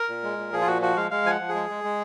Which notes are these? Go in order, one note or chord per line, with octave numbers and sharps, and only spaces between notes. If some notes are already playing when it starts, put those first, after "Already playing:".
Already playing: A#4
A#2
G#3
A#2
F3 G#4
F4
A#2 F#4
F3 F#4
G#3 F5
G#3 F5
F3 F#5 G#5
F3
G#4
G#3
G#3
G#3